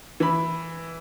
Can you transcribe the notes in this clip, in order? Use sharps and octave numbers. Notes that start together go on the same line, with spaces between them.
E3 B5